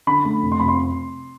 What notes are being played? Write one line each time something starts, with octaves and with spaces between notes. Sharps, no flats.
D3 B5
A3
F1
C6
F1 B5
C6